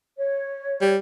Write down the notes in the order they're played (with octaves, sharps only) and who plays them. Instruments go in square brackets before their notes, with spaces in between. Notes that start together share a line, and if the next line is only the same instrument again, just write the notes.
[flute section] C#5
[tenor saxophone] G3